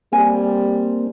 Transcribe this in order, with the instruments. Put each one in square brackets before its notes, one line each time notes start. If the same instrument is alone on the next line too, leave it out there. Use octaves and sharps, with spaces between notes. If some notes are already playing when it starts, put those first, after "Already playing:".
[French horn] G3 [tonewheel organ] A#3 C4 [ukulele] G#5